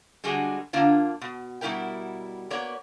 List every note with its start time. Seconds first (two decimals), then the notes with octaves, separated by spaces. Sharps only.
0.24 D3 G3 G#3 F#4 G#4
0.73 D3 A#3 D4 F4
1.21 B2
1.61 B2 G3 D#4 E4 A#4 G5
2.50 A#3 B3 C#5 D5